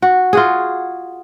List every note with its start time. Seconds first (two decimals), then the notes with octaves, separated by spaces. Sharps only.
0.02 F#4
0.33 F4 F#4 G#4